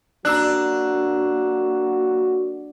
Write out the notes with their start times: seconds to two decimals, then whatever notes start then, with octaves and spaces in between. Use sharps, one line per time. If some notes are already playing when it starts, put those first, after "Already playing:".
0.25 F#3 A#3 D4 F#4 A#5 E6 F#6